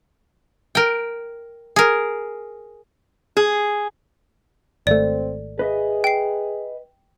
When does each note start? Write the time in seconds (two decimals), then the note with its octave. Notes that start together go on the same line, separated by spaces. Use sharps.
0.75 A#4 G5
1.76 G#4 A#4
3.37 G#4
4.87 G#1 A3 C4 D5
5.59 G#4 B4 D#5 E5
6.04 G5 C7